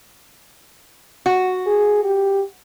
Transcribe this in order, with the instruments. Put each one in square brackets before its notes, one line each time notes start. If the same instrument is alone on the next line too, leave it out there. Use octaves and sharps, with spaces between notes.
[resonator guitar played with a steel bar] F#4
[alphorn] G#4
G4